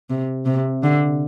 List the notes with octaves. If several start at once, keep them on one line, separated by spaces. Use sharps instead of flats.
C3
C3
D3